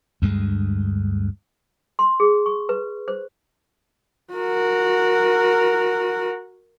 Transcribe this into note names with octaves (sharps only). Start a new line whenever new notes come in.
D2 G2 G#3
C6
G#4
C#6
B4
C5
F#4 A#4